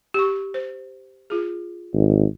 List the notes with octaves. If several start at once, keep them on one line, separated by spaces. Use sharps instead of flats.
G4 C#6
C5
F4 G#4
G#1